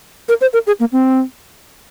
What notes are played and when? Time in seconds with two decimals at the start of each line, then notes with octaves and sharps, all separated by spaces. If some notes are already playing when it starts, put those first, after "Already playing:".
0.29 A#4
0.41 C5
0.53 A#4
0.67 G#4
0.80 A#3
0.92 C4